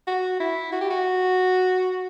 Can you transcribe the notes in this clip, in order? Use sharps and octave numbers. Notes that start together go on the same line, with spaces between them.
F#4
E4
F#4
G4
F#4